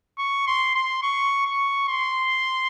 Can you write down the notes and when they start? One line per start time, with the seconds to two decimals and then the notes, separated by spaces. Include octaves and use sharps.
0.18 C#6
0.47 C6
0.75 C6
1.03 C#6
1.46 C#6
1.88 C6